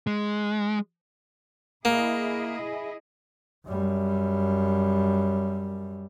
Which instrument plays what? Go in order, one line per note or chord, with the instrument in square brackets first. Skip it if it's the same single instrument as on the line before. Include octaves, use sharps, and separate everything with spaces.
[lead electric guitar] G#3
[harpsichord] A#3 [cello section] E4 G#4 D#5
[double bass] F#2 G3